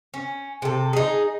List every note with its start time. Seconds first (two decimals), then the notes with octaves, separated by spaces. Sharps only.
0.14 C#4
0.62 C3 A4
0.93 D#4 G#4